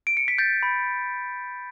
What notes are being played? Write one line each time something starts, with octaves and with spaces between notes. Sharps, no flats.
D7
C#7
B6
G6 A6
B5